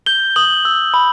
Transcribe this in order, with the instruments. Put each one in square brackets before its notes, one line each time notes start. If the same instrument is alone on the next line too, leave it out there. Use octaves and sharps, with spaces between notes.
[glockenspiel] G6 G7
D#6 F#7
E6
B5